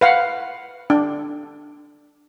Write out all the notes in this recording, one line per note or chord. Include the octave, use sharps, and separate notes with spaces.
B4 F5 F#5
D4